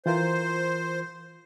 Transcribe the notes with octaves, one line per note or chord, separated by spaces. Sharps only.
E3 F4 A#4 C5